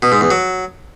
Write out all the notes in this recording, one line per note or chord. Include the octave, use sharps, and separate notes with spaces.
B2
G#2
E2
F#3